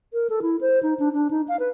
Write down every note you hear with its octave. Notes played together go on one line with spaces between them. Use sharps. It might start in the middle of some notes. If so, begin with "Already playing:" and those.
A#4
A4
E4
C5
D#4
D4
D4
D#4
F5
B4